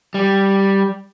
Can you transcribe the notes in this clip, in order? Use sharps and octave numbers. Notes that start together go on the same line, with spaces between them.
G3